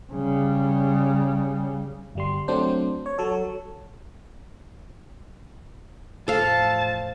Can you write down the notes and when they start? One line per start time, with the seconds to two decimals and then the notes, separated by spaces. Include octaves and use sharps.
0.13 C#3 G3
2.15 G1 G3 C6
2.48 F#3 A3 C4 D4 C5
3.06 C#5
3.18 F#3 A4 C#5
6.28 E2 A2 F3 A4 F5 A5